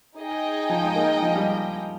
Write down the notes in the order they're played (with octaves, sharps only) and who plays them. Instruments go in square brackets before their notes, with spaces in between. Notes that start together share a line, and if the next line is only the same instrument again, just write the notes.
[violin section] D#4 G#4 D#5 G5
[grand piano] F3
G#3
A#3
G#3
F3
G3